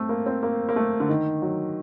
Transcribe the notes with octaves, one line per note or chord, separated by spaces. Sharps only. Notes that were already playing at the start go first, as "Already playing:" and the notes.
Already playing: A3 C4
A#3
C4
A#3
A#3
A3
D3
D#3
F#3